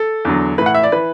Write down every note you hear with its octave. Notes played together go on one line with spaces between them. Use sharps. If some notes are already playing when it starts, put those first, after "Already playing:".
Already playing: A4
E2 D3 F#3
A2 E3 B4
F#5
E5
D5
E3 B4